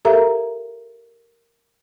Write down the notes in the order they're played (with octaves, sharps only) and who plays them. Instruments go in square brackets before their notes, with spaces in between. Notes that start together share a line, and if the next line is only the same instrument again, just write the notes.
[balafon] G4 A4 A#4 E5 F5 A#5